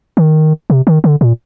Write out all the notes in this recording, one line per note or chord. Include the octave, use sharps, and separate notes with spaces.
D#3
C3
D#3
D3
A#2